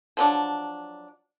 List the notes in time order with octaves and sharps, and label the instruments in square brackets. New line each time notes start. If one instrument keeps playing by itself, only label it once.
[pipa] F3 F#3 D4